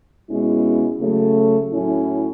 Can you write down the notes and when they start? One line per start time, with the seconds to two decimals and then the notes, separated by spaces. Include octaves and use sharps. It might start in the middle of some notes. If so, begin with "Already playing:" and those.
0.29 B2 G#3 C#4 E4
1.01 C#3 F#3 A3
1.72 A2 F#3 C#4 E4